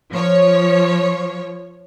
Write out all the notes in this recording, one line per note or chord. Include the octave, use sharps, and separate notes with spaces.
F3 C#5